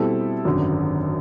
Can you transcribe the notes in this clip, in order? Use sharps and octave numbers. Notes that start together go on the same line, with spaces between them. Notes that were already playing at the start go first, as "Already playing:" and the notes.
Already playing: B2 G3 C4 E4 A4
G#1 F#2 D3